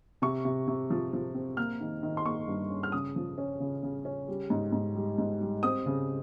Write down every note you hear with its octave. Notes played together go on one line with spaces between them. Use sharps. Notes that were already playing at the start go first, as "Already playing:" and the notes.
C3 C#6
C3
C3
F3
F3
C4
A#3 F6
D#3
D#3
C6
A#3 C#6
G2
C#4
F6
C#3 D#6
F3
C#4
C#3
C#3
C#4
G3
G#2
G#2
G3
G#2
G3
C4 D#6
C#3